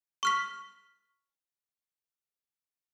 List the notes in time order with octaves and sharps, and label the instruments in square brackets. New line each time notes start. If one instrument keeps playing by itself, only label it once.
[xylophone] C#6 F6 B6